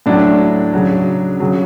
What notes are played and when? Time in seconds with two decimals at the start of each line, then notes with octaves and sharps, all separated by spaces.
0.06 A2 F#3 D4
0.74 C#3 F#3
1.40 C#3 F#3